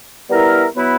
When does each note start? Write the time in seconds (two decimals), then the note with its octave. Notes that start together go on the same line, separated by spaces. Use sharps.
0.29 G3 B3 E4 A#4 E5
0.74 F#3 B3 E4 B4